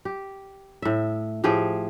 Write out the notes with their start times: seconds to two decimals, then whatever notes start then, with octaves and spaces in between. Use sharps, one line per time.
0.05 G4
0.82 A2 E5
1.44 A2 F3 G4 G#4